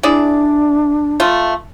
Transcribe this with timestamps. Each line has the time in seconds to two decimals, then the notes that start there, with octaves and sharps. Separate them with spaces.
0.03 D4 E4 G#4 D5
1.20 A3 F4